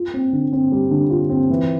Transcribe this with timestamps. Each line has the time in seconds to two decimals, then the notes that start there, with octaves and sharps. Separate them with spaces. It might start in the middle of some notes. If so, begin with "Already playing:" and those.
Already playing: F4
0.14 C4
0.33 D3
0.53 C4
0.72 G3
0.91 D3
1.10 F4
1.29 C4
1.50 E3